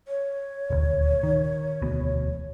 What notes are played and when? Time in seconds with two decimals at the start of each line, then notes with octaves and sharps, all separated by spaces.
0.08 C#5
0.70 D#1 D2
1.23 D#3
1.82 E1 D2 B2